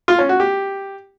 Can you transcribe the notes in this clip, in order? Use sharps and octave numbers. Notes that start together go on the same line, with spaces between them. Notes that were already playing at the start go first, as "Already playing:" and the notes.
F4
C#4
F#4
G4